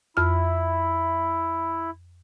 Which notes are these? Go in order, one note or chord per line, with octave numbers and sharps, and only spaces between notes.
F2 E4 F6